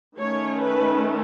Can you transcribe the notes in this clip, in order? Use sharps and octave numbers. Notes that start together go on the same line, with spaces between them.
D#3 A3 C#4 C#5
B4